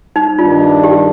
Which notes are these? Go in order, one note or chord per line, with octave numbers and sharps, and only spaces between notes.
D#4
G2 D#3 G3 D4 F4
G4